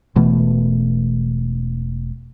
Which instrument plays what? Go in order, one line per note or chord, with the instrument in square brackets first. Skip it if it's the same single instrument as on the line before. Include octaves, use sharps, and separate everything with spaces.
[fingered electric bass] E1 B2 E3 A3